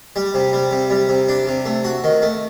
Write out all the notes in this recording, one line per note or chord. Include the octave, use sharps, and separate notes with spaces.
G3
C3
G3
C3
G3
C3
D4
C3
A3
F#4
D#3
A3